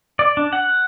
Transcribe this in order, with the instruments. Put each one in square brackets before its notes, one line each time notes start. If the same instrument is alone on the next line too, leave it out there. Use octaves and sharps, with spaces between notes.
[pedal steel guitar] D5
D4
F#5